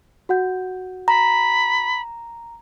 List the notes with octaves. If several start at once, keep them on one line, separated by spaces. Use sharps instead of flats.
F#4 F#5 G6
A#5 B5